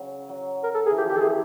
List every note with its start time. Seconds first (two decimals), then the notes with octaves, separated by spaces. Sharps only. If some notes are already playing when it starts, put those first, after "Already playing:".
Already playing: C#3 F#3
0.29 F#3
0.64 A#4
0.74 A4
0.86 G#4
0.90 E3
0.98 F3 G4
1.09 D#3 G4
1.17 A4
1.21 E3 G#4